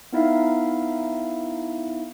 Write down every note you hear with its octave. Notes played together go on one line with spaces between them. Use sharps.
B3 D#4 E4 E5 F5